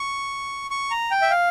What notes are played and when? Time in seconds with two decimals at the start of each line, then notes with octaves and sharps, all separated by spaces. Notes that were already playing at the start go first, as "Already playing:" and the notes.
Already playing: C#6
0.71 C#6
0.91 A#5
1.11 G5
1.22 E5
1.31 F5